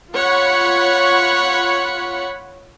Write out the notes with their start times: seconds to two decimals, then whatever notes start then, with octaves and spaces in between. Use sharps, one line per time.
0.12 F4 C#5 F#5 B5